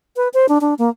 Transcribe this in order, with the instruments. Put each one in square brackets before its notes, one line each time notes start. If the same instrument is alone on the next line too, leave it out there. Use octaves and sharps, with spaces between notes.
[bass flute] B4
C5
D4
D4
A#3